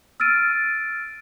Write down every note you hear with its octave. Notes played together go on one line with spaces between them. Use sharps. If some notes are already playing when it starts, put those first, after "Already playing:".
E6 F6 A6 D7 D#7